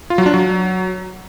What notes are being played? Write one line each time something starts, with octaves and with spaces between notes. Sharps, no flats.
F4
F#3
D4
F#3